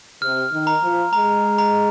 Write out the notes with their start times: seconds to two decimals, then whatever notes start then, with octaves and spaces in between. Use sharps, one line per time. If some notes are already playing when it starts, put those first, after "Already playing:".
0.22 C3 F6
0.52 D#3
0.67 A#5
0.83 F3
1.13 G#3 A#5
1.58 A#5